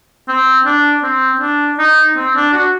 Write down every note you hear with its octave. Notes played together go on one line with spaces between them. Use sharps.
C4
D4
C4
D4
D#4
C4
D4
F#4